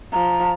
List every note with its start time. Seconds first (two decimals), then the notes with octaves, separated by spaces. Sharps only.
0.12 F3 A#5